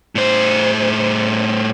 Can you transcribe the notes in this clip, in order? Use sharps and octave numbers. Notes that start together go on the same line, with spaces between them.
A2 C5